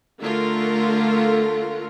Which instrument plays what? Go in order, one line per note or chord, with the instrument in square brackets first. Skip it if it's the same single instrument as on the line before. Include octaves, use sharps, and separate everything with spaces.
[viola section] D3 A3 F4 A#4